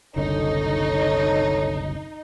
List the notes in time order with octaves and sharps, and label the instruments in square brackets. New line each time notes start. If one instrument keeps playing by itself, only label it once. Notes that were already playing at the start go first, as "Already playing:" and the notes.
[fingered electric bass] F#1 C2 D3 [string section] D#4 [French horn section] A4 C#5